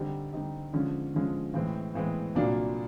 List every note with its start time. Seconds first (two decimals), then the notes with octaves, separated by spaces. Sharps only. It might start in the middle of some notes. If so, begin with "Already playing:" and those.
Already playing: D3 G3 C4 D#4 G4
0.33 D3 G3 C4 D#4 G4
0.73 D3 F3 G#3 C#4
1.14 D3 F3 G#3 C#4
1.54 A2 E3 G#3 C4
1.94 A2 E3 G#3 C4
2.35 C2 A#2 F#3 A#3 D4